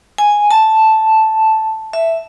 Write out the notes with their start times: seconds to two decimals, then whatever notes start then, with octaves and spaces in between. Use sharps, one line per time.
0.18 G#5
0.51 A5
1.93 E5